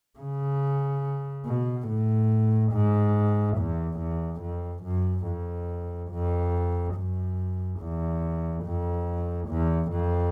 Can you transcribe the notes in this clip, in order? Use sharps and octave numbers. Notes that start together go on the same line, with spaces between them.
C#3
B2
A2
G#2
E2
E2
F2
F#2
F2
F2
F#2
E2
F2
E2
F2